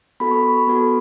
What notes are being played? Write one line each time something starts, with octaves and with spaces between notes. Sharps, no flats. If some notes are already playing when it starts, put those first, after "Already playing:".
B3 F#4 A4 B5
C#6
B5
B3 F#4 A4